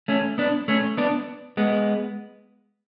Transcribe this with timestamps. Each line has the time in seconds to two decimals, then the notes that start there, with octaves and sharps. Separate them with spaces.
0.08 A3 C#4
0.38 B3 D4
0.68 A3 C#4
0.97 B3 D4
1.57 G#3 B3